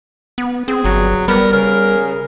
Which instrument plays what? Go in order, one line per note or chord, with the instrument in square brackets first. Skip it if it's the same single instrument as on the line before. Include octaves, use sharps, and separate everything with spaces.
[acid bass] B3
[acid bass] C4 [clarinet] G#4
[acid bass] G1 [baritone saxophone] F#3
[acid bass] G3 [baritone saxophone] B3 [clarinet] A#4
[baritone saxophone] C#3 [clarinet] A#4